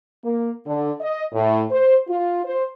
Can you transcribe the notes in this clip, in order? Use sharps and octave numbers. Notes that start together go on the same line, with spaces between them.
A#3
D3
D#5
A2
C5
F4
C5